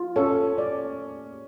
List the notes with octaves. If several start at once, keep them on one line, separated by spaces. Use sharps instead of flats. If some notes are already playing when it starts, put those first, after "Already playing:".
Already playing: F4
C#4 A4
D5